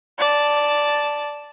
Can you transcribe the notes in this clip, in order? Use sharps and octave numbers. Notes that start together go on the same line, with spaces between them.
D5 A5